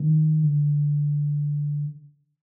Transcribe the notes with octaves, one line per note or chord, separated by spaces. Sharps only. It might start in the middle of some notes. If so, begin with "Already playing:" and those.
Already playing: D#3
D3